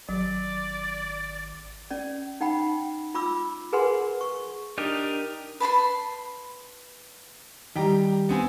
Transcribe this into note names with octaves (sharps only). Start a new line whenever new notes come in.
G#1 F#3 D5
C#4 D5
D#4 F#5 G5 B5
F4 B5 D6 E6
G#4 A#4 B4 F#5 G#5 C6
C#6
D4 D#4 G4 A#4
B4 A5 B5 C6
D#3 G3 G4 G5 A#5
B3 C4 G#5